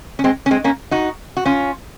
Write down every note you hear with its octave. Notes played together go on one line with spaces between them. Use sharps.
C#4
G#3 C4
C#4
G#3 C4
A#3 C#4
D#4 F#4
F#4
C#4 F4